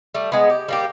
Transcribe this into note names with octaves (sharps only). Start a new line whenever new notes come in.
G3 A3
G#3 B3
G4
G3 A#3 G4